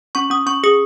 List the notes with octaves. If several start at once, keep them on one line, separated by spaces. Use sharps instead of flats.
C#4 C#6
C#4 D#6
C#4 C#6
G#4 D#6